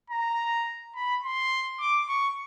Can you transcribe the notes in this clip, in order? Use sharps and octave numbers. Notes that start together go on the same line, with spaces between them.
A#5
B5
C6
D6
C#6